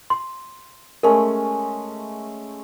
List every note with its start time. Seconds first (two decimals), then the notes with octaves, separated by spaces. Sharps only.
0.10 C6
1.03 G#3 A3 C#4 A#4